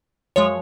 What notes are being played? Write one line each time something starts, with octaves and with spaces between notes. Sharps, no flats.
F#2 F3 G#3 C#5